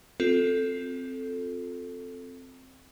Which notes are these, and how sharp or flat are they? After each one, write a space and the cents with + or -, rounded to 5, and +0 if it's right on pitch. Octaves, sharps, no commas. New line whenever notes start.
C4 +0 F4 +30 A4 +0